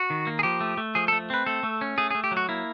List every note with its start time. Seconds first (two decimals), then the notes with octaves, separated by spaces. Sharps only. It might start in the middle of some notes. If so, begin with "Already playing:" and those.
Already playing: F#4
0.10 D#3
0.27 A#3
0.39 G#4
0.43 F3 G4
0.61 A3
0.77 A3
0.95 F3 G#4
1.08 A4
1.12 A3
1.30 C4 B4
1.46 A3 A4
1.63 A3
1.81 C#4
1.98 A3 G#4
2.11 G#4
2.15 A3
2.24 G4
2.32 F#3
2.37 F#4
2.49 A#3 E4